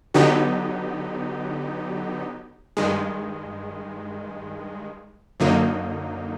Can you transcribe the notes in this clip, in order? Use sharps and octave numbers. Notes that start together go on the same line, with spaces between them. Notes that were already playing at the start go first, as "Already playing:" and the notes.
D3 F#3 B3 D#4 G4
G2 D#3 G#3
F#2 D3 F#3 A#3 D#4